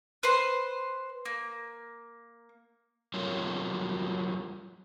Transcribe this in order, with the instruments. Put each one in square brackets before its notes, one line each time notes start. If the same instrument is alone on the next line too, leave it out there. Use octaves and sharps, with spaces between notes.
[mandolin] B4 C5 C6
A#3
[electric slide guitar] F#3 G3 F4 F#4 A#4 C#5